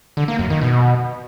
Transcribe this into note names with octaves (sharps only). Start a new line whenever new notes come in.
D3
A#3
F#2
D#3
B2